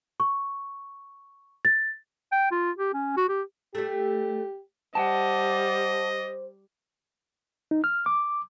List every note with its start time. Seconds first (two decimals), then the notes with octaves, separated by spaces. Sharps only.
0.20 C#6
1.65 A6
2.32 G5
2.51 F4
2.78 G4
2.94 C#4
3.17 F#4
3.29 G4
3.75 G3 A3 G4
4.95 G3 C5 D#5 F#5 G5 A5
7.71 D#4
7.84 F6
8.06 D6